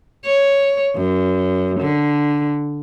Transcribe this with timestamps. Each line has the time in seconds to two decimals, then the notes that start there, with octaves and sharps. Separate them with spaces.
0.25 C#5
0.96 F#2
1.80 D3